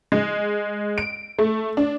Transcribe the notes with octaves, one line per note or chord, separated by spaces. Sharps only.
G#3
D7
A3
D4